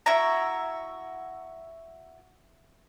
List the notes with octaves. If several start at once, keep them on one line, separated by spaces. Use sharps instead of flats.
E4 F#4 E5 A#5